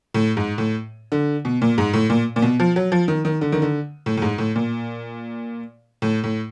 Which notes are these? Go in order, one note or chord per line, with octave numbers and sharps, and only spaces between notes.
A2
G#2
A2
D3
B2
A#2
G#2
A2
A#2
A#2
B2
F3
F#3
F3
D#3
D#3
D3
D#3
D3
A2
A2
G#2
A2
A#2
A2
A2